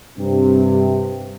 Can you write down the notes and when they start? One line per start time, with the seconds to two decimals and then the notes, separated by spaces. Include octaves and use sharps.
0.18 G2 C3